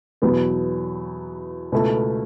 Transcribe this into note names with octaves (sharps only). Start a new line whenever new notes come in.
E2 B2 F#3 B3
C#2 B2 A3 E4 A4